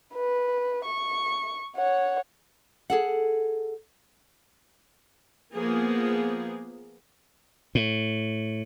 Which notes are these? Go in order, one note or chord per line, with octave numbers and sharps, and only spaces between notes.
B4
C#6
C#5 F#5
G#4 A4 F#5
F3 A#3 B3 G#4
A2